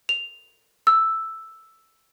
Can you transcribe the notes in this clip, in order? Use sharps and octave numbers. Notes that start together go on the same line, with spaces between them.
F7
E6